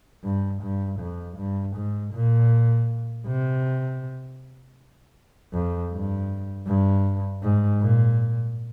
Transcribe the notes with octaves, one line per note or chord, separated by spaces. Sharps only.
G2
G2
F2
G2
G#2
A#2
C3
F2
G2
G2
G#2
A#2